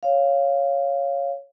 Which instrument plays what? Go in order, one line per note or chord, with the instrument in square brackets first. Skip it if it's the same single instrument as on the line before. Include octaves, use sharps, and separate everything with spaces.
[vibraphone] C#5 F5